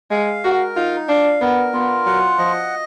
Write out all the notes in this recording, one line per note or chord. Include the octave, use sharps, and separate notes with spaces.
G#3 F5
F#4 A#4
D#4 F4
D4 F5
B3 A#4
B3 F4
F#3 F#5
F3 D#5